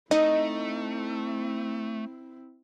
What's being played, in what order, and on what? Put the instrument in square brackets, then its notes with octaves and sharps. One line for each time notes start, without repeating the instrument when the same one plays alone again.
[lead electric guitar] A3 [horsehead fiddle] C4 E4 [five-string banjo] D#4 [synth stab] D#5